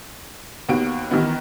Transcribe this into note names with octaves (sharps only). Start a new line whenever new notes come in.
D#2 B3 F#4 D7
D#3 E3 B3